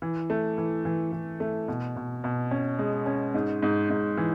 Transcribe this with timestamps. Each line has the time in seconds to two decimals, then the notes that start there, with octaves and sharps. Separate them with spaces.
0.02 E3
0.30 A3
0.58 E3
0.85 E3
1.12 E3
1.40 A3
1.68 B2
1.96 B2
2.24 B2
2.51 C#4
2.79 G#3
3.06 C#4
3.34 G#2
3.62 G#2
3.90 G#2
4.17 E3